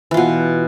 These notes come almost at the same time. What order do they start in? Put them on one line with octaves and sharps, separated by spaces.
E3 F4 B2